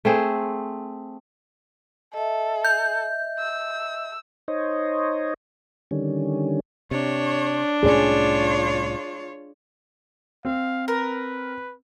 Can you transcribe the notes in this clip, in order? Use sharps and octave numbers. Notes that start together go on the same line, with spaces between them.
A3 C4 G#4
A4 D#5 E5
G6
E6
D#4 C5 C#5 D#5
D3 D#3 G3 C#4
C3 D4 C#5
C2 A2 C#4 F4 G#4 C#5 D5
C4 F5
A#4 B4